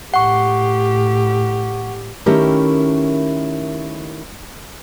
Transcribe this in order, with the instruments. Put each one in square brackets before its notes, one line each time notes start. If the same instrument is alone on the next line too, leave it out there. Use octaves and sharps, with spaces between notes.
[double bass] A2 [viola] G4 [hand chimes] F#5 C#6
[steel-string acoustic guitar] D#3 A3 C#4 E4 G4 A#4